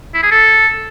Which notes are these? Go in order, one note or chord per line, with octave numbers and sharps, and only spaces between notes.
E4
G#4
A4